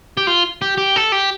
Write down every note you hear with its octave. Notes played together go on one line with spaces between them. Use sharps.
G4
F4
G4
G4
A4
G4